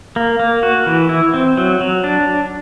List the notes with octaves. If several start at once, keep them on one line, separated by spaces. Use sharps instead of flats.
A#3
A#3
F#4
E3
E4
C4
F#3
F#3
D4